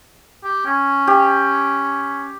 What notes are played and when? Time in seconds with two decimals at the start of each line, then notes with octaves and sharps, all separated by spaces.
0.44 G4
0.65 C#4
1.07 G4